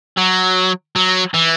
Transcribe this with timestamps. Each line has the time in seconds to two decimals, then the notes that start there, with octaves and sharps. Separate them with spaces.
0.18 F#3
0.96 F#3
1.34 E3